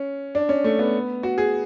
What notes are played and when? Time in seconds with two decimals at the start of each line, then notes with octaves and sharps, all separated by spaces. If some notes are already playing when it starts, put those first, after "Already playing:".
Already playing: C#4
0.35 D4
0.49 C#4
0.64 A3
0.79 B3
1.23 F#4
1.38 G#4